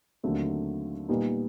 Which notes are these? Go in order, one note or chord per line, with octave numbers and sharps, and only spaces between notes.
D#2 D3 F#3 A3 C4
A#2 G3 B3 D#4